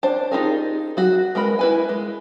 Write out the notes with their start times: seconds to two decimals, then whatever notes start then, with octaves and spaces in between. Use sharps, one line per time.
0.03 D4 C5 A5
0.31 D#4 F4 G4 G#4 A#4
0.97 F#3 F#4
1.35 G#3 A#4 B4 B5
1.59 E4 B4 G#5
1.89 G#3